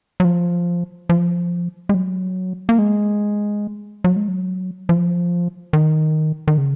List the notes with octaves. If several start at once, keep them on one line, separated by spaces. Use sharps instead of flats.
F#3
F3
F3
G#3
F#3
A#3
G#3
F#3
G#3
F#3
F3
D#3
D#3
C#3